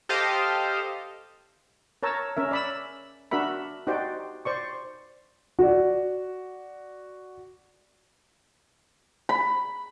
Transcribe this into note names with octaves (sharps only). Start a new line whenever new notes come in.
G4 A4 C5 D#5 F5
A#4 C#5 A5 A#5 E6
C#4 A#4 E5
D5 B5 E6
D4 F#4 A#4 E5 B5
D#4 F#4 G4 C5 D5 G5
C5 D5 C#6
F#4 D5
B5